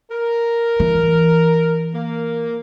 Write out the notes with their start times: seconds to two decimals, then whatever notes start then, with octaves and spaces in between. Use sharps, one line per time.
0.11 A#4
0.80 E3
1.94 A#3